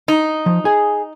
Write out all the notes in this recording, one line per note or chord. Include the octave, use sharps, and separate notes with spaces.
D#4
F3
G#4 G#5